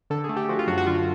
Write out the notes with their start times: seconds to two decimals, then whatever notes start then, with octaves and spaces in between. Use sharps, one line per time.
0.10 D3 A4
0.24 G#4
0.29 A3
0.37 G4
0.49 F3 F#4
0.59 F4
0.67 F#2 F#4
0.78 F#4
0.87 D3 F4